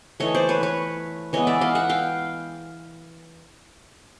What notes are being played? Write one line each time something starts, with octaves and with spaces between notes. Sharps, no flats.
E3 A3 C#5 D#5
C5 D5
B4 C#5
B4 C#5
E3 G#3 B3 C#5 D#5
D5 E5
D#5 F5
E5 F#5
F5 G5